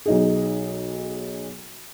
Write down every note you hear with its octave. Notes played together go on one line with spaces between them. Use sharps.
B1 D#4 G#4